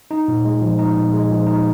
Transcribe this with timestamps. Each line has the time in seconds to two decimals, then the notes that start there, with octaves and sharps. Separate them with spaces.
0.11 D#4
0.28 A#2
0.45 G#3
0.62 F3
0.79 D#4
0.96 A#2
1.13 G#3
1.30 F3
1.47 D#4